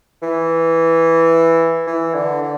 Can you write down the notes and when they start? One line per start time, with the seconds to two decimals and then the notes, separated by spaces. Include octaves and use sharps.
0.22 E3
1.87 E3
2.15 D3
2.42 D3